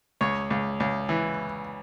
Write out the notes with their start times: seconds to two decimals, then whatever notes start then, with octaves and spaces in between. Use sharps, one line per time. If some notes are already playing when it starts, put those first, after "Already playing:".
0.21 C#2 C#5
0.50 C#2
0.80 C#2
1.09 E3